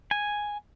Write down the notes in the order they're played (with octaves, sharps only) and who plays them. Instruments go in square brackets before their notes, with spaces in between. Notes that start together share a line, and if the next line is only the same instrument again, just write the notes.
[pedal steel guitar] G#5